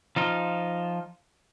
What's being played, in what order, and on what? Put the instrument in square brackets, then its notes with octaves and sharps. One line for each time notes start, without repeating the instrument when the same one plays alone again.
[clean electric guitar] F3 D#4 F4